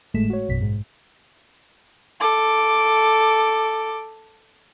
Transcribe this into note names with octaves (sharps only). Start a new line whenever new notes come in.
G#1 A2 G#3 A3 B6 E7
F#4 C#5
A#1 F#2 B2 B6
G#2
A4 D6